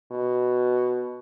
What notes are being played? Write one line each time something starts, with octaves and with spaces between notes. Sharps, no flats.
B2